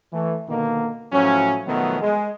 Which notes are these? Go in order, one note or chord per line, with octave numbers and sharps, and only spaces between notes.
E3 A3
B2 D3 D#3 A#3
A2 F3 F#3 C#4
B2 D#3 F3 F#3 A3 B3
G#3